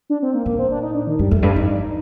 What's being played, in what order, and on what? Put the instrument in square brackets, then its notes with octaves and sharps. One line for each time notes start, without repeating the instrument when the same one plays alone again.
[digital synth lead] D4
C4
A#3
[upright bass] A#2 [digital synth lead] A#3
[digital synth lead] C4
D4
D#4
D4
D#3
[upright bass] G2 [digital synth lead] G3
[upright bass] F2 [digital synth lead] A3
[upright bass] G2 [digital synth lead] D4
[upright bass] F2 [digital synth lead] D#4
[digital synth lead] D4
D#4